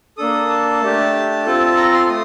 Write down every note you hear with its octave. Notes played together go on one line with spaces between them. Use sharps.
A#3 D4 A4 D#6
A5
A3 D4 G4
C4 F4 A4
A#5
C6
A3 D#6